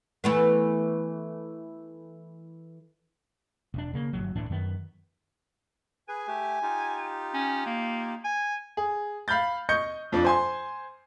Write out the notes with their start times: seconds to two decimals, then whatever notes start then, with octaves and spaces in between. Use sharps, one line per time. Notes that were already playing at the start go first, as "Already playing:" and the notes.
0.24 E3 A3 B3
3.74 E1 D4
3.93 C#3 A#3
4.13 G1 D#2 F#3
4.35 D1 A2 E3 D4
4.50 F#2 D#3 B3
6.08 G#4 B4 G#5
6.27 A3 G4
6.62 D#4 F4 G4
7.34 C#4
7.66 A#3
8.24 G#5
8.77 G#4
9.28 F5 B5 F6 G6 A6
9.69 D#5 C#6 G6 C#7
10.12 F2 F3 D4
10.25 C5 G#5 C6